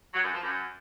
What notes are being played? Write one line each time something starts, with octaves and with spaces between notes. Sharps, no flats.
F#3
F#2
F3
F#2